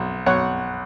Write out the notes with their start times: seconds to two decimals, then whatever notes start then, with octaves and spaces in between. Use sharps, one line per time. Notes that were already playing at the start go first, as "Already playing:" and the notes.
Already playing: B1
0.26 B1 C#5 F#5